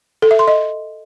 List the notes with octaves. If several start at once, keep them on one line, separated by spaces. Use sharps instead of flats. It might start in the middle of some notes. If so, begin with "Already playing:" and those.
A4
E5
C6
D#5